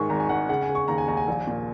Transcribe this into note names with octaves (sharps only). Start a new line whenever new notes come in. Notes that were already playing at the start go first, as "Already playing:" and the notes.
Already playing: G#2 D#3 G#5 C#6
G#1 A#5
G#5
G#1 F#5
C#3 F#5
G#5
C#3
C#6
D#2 A#5
G#5
D#2 A#5
G#5
A#1
A#2